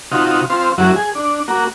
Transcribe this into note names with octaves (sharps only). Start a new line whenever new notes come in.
C3 D#4 F4 F#4
C4 F4 C5
F#2 F#3 E4 F#4
G#4
D4
A#3 F#4